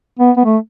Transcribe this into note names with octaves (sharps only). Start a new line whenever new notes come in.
B3
B3
A3